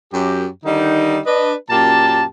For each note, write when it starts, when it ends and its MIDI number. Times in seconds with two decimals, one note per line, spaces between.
0.12 0.46 42
0.12 0.46 67
0.65 1.18 50
0.65 1.18 51
0.65 1.18 55
0.65 1.18 63
1.25 1.53 62
1.25 1.53 71
1.25 1.53 75
1.69 2.23 42
1.69 2.23 46
1.69 2.23 58
1.69 2.23 67
1.69 2.23 81